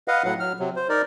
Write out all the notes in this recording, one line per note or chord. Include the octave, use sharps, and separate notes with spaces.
B4 D#5 F5 F#5
A2 F#3 F#5
F#3 F6
C3 F#3
C5
D#4 A#4 D5